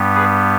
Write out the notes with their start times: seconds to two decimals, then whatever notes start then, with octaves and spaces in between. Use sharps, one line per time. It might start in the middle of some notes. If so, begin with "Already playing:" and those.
Already playing: G2 G3 B3
0.15 G#4 B4